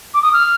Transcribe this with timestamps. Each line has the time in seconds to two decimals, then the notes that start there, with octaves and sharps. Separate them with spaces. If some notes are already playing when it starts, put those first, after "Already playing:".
0.14 D6
0.23 D#6
0.33 F6